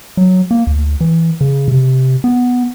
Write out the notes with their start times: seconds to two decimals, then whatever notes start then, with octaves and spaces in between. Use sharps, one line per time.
0.17 F#3
0.51 A#3
0.67 D2
1.01 E3
1.41 C#3
1.68 C3
2.24 B3